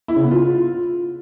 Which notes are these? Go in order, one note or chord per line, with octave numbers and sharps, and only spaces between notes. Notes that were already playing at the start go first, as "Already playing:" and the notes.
E4
C#3
B3
F4